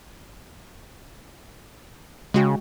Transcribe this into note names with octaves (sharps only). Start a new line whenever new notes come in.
C#3 G#3 F#4 G5